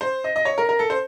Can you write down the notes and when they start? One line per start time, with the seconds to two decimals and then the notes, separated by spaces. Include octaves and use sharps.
0.01 C5
0.24 D#5
0.36 D#5
0.45 C#5
0.58 A#4
0.69 A#4
0.79 A4
0.90 C5